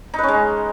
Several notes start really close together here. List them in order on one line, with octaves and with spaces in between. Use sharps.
D#4 B4 C#4 G#3